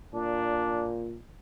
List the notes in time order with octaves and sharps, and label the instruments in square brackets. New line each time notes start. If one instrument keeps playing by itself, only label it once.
[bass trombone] A#2 [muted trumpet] D4